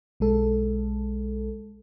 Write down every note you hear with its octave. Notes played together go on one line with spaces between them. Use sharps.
B1 G#3 A4